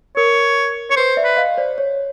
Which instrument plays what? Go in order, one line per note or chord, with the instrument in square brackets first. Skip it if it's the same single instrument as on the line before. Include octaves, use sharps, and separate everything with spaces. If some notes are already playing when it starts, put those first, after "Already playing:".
[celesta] A#4 [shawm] C#5
[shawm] C#5
[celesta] B4 [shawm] C5
[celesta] D5 E5
[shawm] B4
[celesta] D#5 F5
C5 D5
C#5